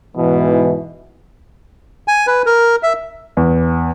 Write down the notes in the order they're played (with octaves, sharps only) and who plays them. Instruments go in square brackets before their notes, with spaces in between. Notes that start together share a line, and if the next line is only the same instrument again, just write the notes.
[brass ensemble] G#2 B2 E3
[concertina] G#5
B4
A#4
E5
[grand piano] E2